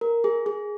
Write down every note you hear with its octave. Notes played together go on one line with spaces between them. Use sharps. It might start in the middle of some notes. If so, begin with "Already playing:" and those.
A#4
G#4
G#4